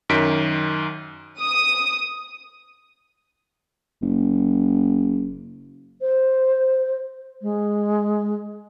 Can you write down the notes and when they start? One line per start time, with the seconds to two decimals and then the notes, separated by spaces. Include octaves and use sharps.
0.09 F#2 D#3 B6 D7
1.39 D#6
4.02 F#1
6.01 C5
7.42 G#3